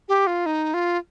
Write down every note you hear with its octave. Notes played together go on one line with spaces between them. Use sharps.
G4
F4
D#4
F4